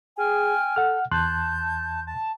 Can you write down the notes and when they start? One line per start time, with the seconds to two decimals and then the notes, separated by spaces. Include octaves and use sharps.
0.18 G#4 G5 G#5 F6
0.76 A4 F#5 F6
1.12 E2 A5 C6 F#6 G6
2.07 A5